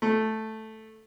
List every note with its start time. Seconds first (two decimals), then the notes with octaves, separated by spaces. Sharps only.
0.02 A3